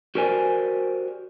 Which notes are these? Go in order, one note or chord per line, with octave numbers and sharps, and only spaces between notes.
F#4 G4 A#4 C5 D5 G#5